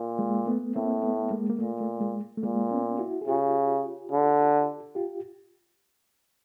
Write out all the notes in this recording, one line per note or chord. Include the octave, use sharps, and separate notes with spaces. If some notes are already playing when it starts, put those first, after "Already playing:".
Already playing: A#2
G#3 A#3
A3 B3
A2 A#3 C4
A3 B3
G#3 A#3
A#3
A#2 A3
A3
G#3
A3
A#2 G#3 A#3
B3 C#4
E4 F#4
G#4
C#3 F4 G4
D3
F4 G4